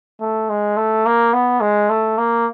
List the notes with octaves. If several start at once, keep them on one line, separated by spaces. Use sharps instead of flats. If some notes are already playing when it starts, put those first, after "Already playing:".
A3
G#3
A3
A#3
B3
G#3
A3
A#3